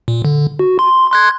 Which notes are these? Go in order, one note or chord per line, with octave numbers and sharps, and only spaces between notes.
A#2
D3
F#4
C6
C6 F#6 G#6